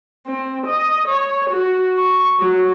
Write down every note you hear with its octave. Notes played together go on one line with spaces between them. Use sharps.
C4
D#5
C#5
F#4
C#6
F#3